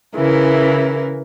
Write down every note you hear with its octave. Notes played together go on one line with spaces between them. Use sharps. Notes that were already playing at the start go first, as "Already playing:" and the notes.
C#3 E3 E4 A#4